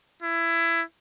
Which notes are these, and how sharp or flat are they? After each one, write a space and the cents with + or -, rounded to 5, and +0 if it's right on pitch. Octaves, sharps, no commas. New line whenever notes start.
E4 +20